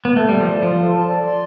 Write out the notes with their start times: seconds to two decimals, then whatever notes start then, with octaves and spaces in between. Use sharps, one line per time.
0.05 B3
0.16 A3 A4
0.29 G3 A5
0.40 F3
0.48 D5
0.63 F3 C6
0.78 A4
0.93 A5
1.09 D5
1.24 C6